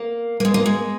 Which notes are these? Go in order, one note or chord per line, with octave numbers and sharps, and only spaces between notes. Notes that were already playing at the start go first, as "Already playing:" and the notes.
Already playing: A#3
A#3
G#3
A#3
G#3